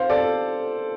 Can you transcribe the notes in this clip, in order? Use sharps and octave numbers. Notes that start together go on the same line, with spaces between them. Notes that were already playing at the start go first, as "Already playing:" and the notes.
Already playing: C5 F5
A4 D5